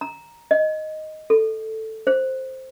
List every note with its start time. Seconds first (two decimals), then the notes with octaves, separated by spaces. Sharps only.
0.01 A#5
0.51 D#5
1.30 A4
2.07 C5